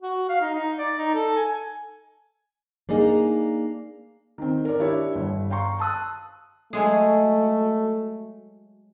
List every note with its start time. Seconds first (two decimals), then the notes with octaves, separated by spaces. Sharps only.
0.02 F#4
0.29 F5
0.41 D#4
0.54 D#4
0.78 D5
0.96 D#4
1.14 A4
1.36 G#5
2.89 A#3 D4 D#4 G#4
4.38 D#3 C4
4.65 A#4 D5
4.79 D4 E4 G4 C#5
5.15 G1
5.50 F5 G5 A#5 C6 C#6
5.79 A5 D#6 F#6
6.73 F#3 G#3 A3 G#4